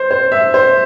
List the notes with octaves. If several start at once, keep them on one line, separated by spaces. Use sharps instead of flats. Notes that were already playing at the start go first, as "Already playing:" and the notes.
Already playing: C5
C5
E5
C5